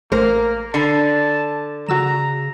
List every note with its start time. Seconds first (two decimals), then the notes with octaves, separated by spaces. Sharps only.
0.12 A1 A3 A#3 A#4 C5
0.74 D3 A5 B5 C7 C#7
1.89 C#3 F#4 A#5 E6 E7